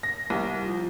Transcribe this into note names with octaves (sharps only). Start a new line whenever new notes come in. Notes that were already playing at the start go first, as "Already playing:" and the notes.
A#6
C2
F3